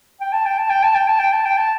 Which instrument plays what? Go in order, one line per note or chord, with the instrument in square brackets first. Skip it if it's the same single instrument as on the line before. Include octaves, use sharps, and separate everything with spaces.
[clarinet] G5
A5
G5
A5
G5
A5
G5
A5
G5
A5
G5
A5